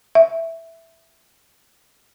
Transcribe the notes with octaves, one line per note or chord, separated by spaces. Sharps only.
E5